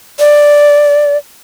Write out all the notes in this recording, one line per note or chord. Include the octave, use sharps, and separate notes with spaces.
D5